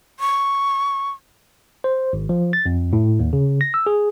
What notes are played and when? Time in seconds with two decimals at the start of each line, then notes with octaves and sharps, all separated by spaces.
0.20 C#6
1.84 C5
2.13 G#1
2.29 F3
2.53 A6
2.66 F2
2.93 A2
3.19 D#2
3.33 C#3
3.61 A#6
3.74 E6
3.86 G#4